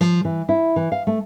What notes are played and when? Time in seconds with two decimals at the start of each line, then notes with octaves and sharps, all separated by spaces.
0.01 F3
0.25 E3
0.49 E4
0.76 E3
0.92 F5
1.07 A3